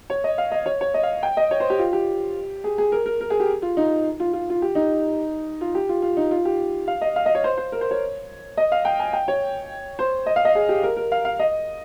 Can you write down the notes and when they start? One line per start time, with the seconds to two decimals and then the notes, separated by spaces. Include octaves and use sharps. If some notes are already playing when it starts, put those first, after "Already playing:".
0.10 C#5
0.24 D#5
0.38 F5
0.51 D#5
0.66 C#5
0.81 C#5
0.94 D#5
1.03 F5
1.23 G5
1.37 D#5
1.51 C#5
1.60 C5
1.70 G4
1.79 F4
1.93 G4
2.64 G#4
2.78 G#4
2.92 A#4
3.06 A#4
3.21 A#4
3.30 G#4
3.40 G4
3.62 F4
3.77 D#4
4.20 F4
4.33 F4
4.50 F4
4.62 G4
4.75 D#4
5.61 F4
5.75 G4
5.89 F4
6.02 F4
6.17 D#4
6.31 F4
6.45 G4
6.88 F5
7.01 D#5
7.16 F5
7.26 D#5
7.35 C#5
7.44 C5
7.58 C5
7.72 A#4
7.81 C5
7.91 C#5
8.57 D#5
8.72 F5
8.85 G5
9.00 G#5
9.13 G5
9.28 C#5
9.99 C5
10.26 D#5
10.36 F5
10.45 D#5
10.55 G#4
10.69 G4
10.83 A#4
10.96 A#4
11.12 F5
11.25 F5
11.39 D#5